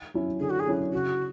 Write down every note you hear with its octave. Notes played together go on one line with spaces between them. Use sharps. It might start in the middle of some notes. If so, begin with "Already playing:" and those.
F#3 C#4 E4
D3 G#4
F#4
G#4
F#3 C#4 E4
C#3 F#4